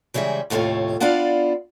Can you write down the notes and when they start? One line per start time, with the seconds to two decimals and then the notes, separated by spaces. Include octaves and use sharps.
0.14 C#3 E3 G3 G#3 E5
0.50 D#2 A2 C3 F4 A4 C#5
1.00 B3 D4 E4 F4 D5 F5